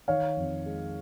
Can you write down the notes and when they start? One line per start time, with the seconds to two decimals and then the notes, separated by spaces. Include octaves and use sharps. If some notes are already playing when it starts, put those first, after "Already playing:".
0.08 D#3 C#5 F5
0.37 F2
0.66 G#3